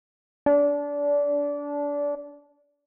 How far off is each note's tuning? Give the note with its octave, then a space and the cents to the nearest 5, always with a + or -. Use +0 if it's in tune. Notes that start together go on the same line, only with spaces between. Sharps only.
D4 -25